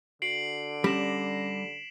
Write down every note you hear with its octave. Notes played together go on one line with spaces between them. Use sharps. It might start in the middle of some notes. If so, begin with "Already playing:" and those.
D3 F#4 C7 D7 F#7
G3 C#4 A#6 B6 E7 F#7